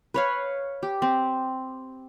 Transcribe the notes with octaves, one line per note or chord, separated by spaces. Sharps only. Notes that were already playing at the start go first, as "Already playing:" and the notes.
B4 C#5 F5
G4
C4